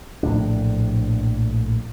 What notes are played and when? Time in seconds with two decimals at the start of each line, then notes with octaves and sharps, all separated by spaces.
0.23 A#1 A2 D3 D4